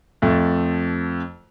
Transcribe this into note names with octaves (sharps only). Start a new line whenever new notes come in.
F2 A3